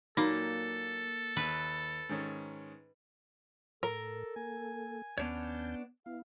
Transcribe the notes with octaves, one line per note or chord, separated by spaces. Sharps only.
A#2 F#3 A#3 D#4 A4
D#2 B4
G#2 D#3 C#4
A2 A4 A#4
A#3 A4 G#5
D#2 B3 C#4 D4 C#5 A5 G6
B3 E4 F5